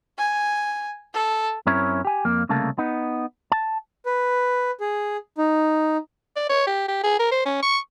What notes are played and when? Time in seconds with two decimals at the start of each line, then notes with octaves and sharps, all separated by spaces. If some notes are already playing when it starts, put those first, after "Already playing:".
0.18 G#5
1.14 A4
1.66 F#2 C4 C#4 E4 A#4 C#5
2.05 G4 G#5
2.25 F2 A#3
2.49 C2 C#3 A3 A#3 A5
2.78 B3 D#4
3.52 A5
4.06 B4
4.81 G#4
5.38 D#4
6.36 D5
6.50 C#5
6.67 G4
6.89 G4
7.04 G#4
7.20 A#4
7.32 C5
7.46 C#4
7.63 C#6